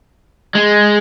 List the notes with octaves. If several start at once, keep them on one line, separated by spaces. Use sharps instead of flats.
G#3